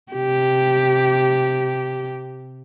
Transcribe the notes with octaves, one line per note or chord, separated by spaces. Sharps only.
C3 G4